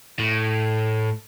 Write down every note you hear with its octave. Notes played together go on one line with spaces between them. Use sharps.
A2